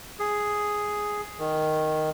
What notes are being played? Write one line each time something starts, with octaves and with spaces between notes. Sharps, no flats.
G#4
D#3